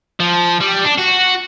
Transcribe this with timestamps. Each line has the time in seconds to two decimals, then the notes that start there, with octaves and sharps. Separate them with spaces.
0.20 F3
0.60 G3
0.85 D4
0.99 F#4